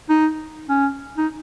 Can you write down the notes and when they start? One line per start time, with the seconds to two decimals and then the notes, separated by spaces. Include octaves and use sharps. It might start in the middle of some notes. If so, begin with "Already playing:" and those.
0.09 D#4
0.69 C#4
1.17 D#4